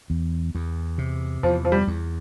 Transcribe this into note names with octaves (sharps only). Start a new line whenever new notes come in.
E2
E2
C3
E2 F3
F3
G3
E2